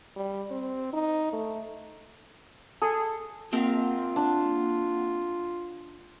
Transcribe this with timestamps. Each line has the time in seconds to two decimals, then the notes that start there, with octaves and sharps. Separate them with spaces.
0.16 G3
0.51 C4
0.93 D#4
1.33 A3
2.82 G#4 A4
3.53 A#3 C4 F4 A#4 F#5 G5
4.16 D4